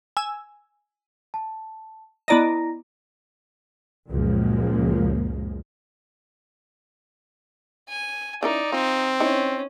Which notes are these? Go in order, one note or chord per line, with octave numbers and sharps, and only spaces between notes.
G#5 E6
A5
B3 E4 D5 D#5 A#5 A#6
C#2 F#2 A#2 F3 G#3 A#3
G#5
E3 C#4 D#4 A#4 D5
C4 F4
C#4 D#4 E4